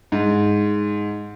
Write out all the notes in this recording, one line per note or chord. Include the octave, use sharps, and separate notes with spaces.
G#2